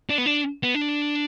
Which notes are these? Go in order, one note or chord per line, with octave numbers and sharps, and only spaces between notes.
D4
B3
D4
B3
D4